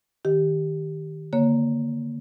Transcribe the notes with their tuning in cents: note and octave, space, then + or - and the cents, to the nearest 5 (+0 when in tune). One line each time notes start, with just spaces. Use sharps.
D#3 +0 G4 +0
D3 -20 A#3 +0 C#5 +0